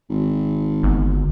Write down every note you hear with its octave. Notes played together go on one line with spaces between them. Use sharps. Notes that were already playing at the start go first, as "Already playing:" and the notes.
G#1
G1